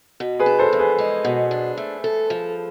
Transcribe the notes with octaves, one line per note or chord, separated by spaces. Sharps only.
B2
G#4 B4
D4
A4 C5
E2
G#4 B4
G#3
B2
D4
A3
A4
F3